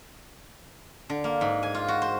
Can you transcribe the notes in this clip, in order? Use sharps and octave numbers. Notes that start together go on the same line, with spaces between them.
D3
A#3
G#2
G#5
F4
F#4
C5